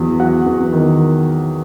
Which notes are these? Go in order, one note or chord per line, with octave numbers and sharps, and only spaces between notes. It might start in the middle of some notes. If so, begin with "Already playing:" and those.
Already playing: E2 F#3
F#3 F#5
E2
D#3